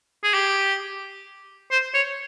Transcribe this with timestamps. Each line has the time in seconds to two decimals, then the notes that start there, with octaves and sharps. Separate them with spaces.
0.24 G#4
0.34 G4
1.71 C5
1.94 C#5